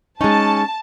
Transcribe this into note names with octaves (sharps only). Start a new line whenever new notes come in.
G#3 C#4 D#4 A5